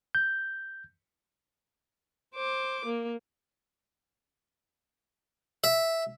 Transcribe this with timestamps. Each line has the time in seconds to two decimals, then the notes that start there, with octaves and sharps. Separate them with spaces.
0.15 G6
2.35 C5 D6
2.86 A#3
5.64 E5